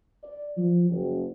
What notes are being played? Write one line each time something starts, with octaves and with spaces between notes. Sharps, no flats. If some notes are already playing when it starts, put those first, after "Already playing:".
D5
F3
F#1